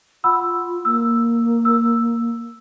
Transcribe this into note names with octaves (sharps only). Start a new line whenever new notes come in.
F4 F#5 B5 E6
A#3 E6
E6